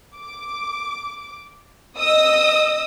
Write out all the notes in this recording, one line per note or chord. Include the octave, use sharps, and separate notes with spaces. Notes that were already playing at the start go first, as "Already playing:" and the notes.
D6
D#5 D#6 E6